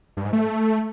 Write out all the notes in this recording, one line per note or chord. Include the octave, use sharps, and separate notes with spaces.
G2
G#2
A3